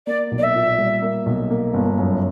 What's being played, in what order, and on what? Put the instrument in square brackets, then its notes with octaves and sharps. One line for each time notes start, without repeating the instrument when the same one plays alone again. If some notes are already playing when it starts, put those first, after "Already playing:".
[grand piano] A#3 [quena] D5
[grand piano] B1
[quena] D5
E5
[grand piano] A#2
G3
A#3
B1
A#3
G1
F#2